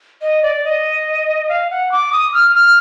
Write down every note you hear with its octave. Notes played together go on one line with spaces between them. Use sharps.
D#5
D5
D#5
F5
F#5
D6
D#6
F6
F6